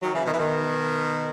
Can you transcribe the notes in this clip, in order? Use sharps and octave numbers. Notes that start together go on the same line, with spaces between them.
D#3 F#3
C#3 E3
B2 D#3
E3
B2 D#3